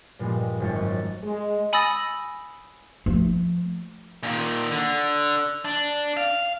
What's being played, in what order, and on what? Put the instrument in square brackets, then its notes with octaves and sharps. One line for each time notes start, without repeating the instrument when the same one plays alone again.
[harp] G2 A#2 F3 G3 G#3
G#1 F#2 C#6 A6
[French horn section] G#3
[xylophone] G#5 B5 D#6 E6 A6 A#6
[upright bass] F3 A3
[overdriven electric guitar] A#2 D#3
D3
D4
F5